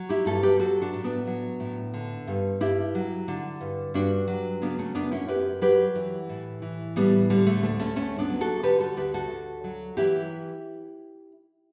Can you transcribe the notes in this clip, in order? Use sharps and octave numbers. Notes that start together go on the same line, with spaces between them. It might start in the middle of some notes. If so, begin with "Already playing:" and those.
Already playing: F#3
E4 G4
G2 F#4 A4
G4 B4
F#3 F#4 A4
D4 F#4
A2
B3 D4
F#3
A2
D3
G2
G2 E4 G4
F#3
D3
G2
G2 D4 F#4
F#3
C#3 B3 D4
A3 C#4
F#2 B3 D4
C#4 E4
F#2 G4 B4
F#3 G4 B4
E3
A2
E3
A2 G3 B3
D3 G3
A3
D2 A3
A3 C#4
D2 A3 C#4
B3 D4
F#3
F#4 A4
D3 G4 B4
F#4 A4
D2 G4 B4
F#4 A4
D2
F#3
E3 E4 G4